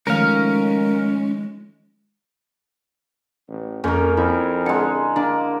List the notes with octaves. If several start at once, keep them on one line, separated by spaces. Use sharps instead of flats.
D#3 F3 G#3 A3 C#4 A#4 F5
A1
F2 A#3 C#4 A#4
F2 E4
D3 G#3 C#7
A#3 D4